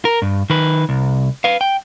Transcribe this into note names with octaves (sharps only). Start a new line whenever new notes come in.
A#4
G2
D#3 B4
C2
B4 F5
G5